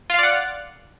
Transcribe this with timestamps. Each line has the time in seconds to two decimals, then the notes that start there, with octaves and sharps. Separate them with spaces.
0.10 F4
0.14 F5
0.19 D5
0.23 F#5